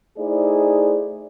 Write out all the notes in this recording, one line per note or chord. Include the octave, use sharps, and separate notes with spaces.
A3 D#4 E4 G#4 C5 D5